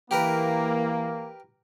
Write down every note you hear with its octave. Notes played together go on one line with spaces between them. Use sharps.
E3 A#3 G4 A#4 B4